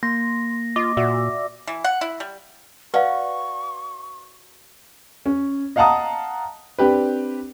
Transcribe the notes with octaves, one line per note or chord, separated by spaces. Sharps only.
A#3 C6 A#6
F4 D#5 D6
A#2 F#4 D5 E5
E3
F#5
E4
G3
F#4 B4 D5 F5 C#6
C#4
D#5 F5 F#5 A5 A#5 D#6
C4 D4 G4 B4